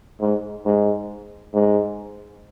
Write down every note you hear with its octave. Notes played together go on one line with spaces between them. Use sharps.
G#2
G#2
G#2